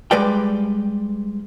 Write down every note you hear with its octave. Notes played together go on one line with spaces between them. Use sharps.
G3 G#3 B4 D5 G5